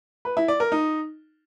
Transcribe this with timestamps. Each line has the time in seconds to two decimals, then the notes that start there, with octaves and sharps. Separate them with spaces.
0.25 B4
0.37 E4
0.48 D5
0.60 A#4
0.72 D#4